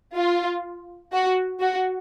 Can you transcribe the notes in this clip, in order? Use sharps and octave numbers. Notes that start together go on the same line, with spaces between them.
F4
F#4
F#4